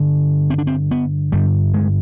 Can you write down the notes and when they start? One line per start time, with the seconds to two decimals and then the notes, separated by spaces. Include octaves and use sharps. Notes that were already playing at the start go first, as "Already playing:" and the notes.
Already playing: G2 D3
0.50 C4
0.58 D4
0.67 C4
0.91 B3
1.32 G2 D3 G3
1.74 G#3